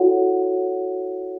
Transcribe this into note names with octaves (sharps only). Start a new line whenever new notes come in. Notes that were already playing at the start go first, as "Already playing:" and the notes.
Already playing: E4 F#4 A4 C#5 F#5